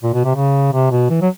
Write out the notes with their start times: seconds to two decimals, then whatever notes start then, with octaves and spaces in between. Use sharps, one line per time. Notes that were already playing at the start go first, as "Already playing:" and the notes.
0.03 A#2
0.14 B2
0.24 C3
0.35 C#3
0.73 C3
0.91 B2
1.10 E3
1.22 F#3